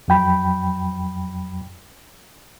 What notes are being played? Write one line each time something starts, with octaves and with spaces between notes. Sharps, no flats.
F2 F#3 G5 B5